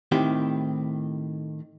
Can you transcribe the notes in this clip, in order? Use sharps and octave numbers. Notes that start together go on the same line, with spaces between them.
A2 D#3 C4 E4 G4